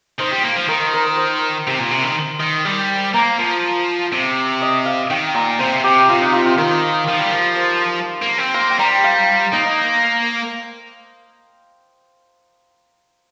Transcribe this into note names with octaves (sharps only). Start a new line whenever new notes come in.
D#3 C5
G3
A#3
F3
D#3 A#4
A#4
C5
C3
A#2
C3
D#3
D#3
G3
A#3 A#5
F3
C3
D#5
F5
D#3 G5
A#2 A#5
C3 C5
C3 G4
C3 F4
D#4
F4
F4
D#3 A#4
F3
G3
F3
C5
A#3
C4
A#3 C6
G5
G3 A#5
F5
A#3 D#4
D#4